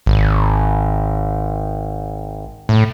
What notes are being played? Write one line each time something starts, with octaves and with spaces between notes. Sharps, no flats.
G#1
A2